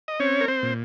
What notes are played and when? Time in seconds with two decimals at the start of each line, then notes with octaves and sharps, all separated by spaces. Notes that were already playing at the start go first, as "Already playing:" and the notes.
0.08 D#5
0.20 C4 C#4 C#5
0.41 A#4
0.48 C4 C5
0.63 A#2